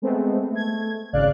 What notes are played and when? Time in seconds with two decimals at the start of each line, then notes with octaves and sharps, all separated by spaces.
0.02 G#3 A3 B3 C4
0.51 A3 G#6
1.13 G#1 C#3 D5 F5 F#6